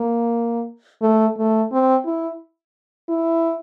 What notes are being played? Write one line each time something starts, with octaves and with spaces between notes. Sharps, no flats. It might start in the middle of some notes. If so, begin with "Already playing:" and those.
Already playing: A#3
A3
A3
C4
E4
E4